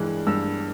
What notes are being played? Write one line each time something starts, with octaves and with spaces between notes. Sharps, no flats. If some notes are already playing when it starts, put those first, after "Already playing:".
Already playing: G2 E3 G#3 F#6
G2 E6